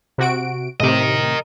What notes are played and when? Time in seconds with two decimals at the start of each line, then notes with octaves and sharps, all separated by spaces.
0.18 C3 F#4 D7
0.80 A2 C3 A#4 D#5